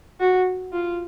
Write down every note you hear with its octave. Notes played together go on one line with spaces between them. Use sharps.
F#4
F4